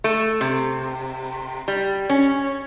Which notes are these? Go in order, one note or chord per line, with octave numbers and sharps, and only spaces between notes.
A3
C3
G3
C#4